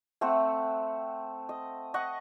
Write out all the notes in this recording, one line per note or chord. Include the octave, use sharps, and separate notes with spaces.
A3 C4 F#5
D#5
D#5 F#5 C#6